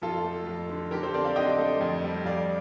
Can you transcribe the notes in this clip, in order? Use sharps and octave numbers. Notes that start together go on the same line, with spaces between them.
F2 F4 A4
A3
F2
D3
D3 G4 A#4
A4 C5
C4 A#4 D5
D5 F5
D3 D#5 G5
A3
F2
G3
F2 D5 F5